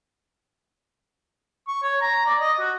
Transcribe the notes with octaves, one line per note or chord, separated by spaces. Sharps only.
C#6
C#5
A#5
D5
D#5
F#4